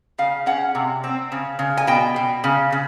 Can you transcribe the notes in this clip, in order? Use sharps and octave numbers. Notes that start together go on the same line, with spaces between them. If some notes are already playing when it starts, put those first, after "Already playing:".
C#3 F5
C#4 F#5
C3
C4
C#3
C#3
G#5
B2 G5
B2
C#3
C#3